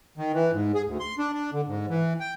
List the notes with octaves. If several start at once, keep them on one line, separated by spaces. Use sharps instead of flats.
D#3
E3
G#2
G#4
D2
C6
D4
D4
D3
G#2
E3
G5